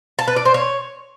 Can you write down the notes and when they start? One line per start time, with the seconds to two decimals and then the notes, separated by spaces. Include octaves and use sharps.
0.19 A5
0.28 B4
0.36 D5
0.45 C5
0.54 C#5